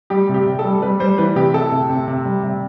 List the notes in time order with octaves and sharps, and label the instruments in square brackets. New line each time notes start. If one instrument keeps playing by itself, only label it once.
[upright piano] G3 G4
C3
G4
C3
A4
G3
G3 B4
G3 C5
E3 B4
C3 G4
C3 A4
C3
C3
C3
G3
C3